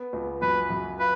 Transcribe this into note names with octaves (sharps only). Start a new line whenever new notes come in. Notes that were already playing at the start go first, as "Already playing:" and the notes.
Already playing: B3
C#2
F#2 B4
F#2
F4 B4